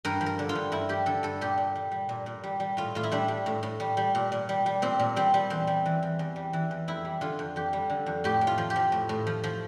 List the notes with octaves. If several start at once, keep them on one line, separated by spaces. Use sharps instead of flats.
G2 A#4
F3
A#4
D3
F4
G2
G2 E4
F3 G4
D3 A4
G2 A4
A#2 G4
A#2
G3
G3
A#2
A#2
G3
G3
A2 F4
A2 F4
E4
G3 D4
G3
A2
A2
G3
G3
A#2
A#2
G3
G3
A#2 C4
A#2
G3 C4
G3
E2 C4
G3
E3
E2
E2
G3
E3
E2
F2 E4
G3
D3 F4
F2
F2 G4
G3
D3
F2
A2 G4
A2
F4
F3
G4
F3
A2
A2
F3
F3